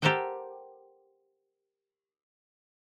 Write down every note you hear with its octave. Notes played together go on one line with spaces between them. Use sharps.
G4 A4 A#4 C5 F#5 G5